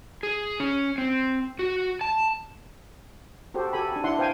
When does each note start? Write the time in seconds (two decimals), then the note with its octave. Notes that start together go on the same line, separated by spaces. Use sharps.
0.23 G#4
0.60 C#4
0.98 C4
1.59 F#4
2.01 A5
3.54 F#4 G4 A4 C5
3.73 F#4 G4 A4 G#5 B5
3.92 D4 G#5
4.04 D4 E4 E5 F#5 C6
4.19 C5 F5 G5 G#5